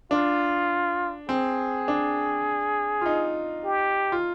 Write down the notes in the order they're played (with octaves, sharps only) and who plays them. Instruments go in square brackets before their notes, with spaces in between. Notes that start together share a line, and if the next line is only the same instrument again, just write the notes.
[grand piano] D4 [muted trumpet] F4
[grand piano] C4 [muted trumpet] G#4
[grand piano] D4
F4
D#4
[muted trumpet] G4
[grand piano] F4